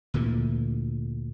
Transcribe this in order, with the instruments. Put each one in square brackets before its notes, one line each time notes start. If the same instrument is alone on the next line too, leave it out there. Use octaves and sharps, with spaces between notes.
[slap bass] D2 A#2 D3 E3